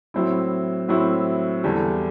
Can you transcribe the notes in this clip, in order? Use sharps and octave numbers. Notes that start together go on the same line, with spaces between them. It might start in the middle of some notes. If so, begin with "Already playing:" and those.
A2 F#3 C4 E4
A2 F#3 C4 E4
E2 D3 G3